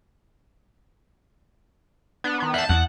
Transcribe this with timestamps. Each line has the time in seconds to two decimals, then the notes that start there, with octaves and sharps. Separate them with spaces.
2.24 B3 D4
2.40 D#3 B3
2.54 E5 F#5 A5 G6
2.69 E2 F#5